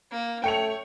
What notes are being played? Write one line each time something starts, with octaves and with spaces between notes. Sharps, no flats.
A#3
A3 C#5 G5 C#7 F7